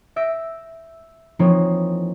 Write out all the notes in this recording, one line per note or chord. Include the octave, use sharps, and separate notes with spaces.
E5 E6 G6 A#6 D7
E3 F3 A#3 C4 D#4 C#5